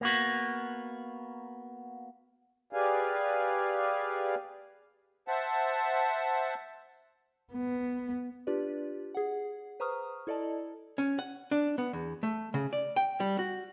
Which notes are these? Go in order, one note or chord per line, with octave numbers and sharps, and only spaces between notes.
A#3 B3 F#4
G4 G#4 B4 D5 F5 G#5
C5 E5 F#5 A5
B3
D4 F4 G4 B4 D5
G#4 F#5
B4 C5 A#5 C#6 D#6 F6
E4 A4 D5 D#5 A5
C#4
F#5
D4
B3
E2
A3
C#3
D5
G5
G3
F#4